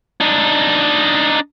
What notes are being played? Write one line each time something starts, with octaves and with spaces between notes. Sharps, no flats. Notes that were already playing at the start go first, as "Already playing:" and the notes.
D4 D#4